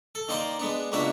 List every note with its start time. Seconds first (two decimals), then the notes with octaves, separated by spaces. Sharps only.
0.15 A4
0.28 D#3 A#3 D#4 C5 D5
0.59 G#3 B3 D4
0.92 C#2 B2 A#3 D4 F#4 E5